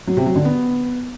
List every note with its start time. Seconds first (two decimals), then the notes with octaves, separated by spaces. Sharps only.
0.07 F#3
0.17 C3
0.26 F#3
0.36 D3
0.45 B3